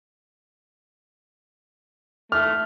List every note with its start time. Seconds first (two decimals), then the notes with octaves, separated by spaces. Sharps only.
2.32 A3 F6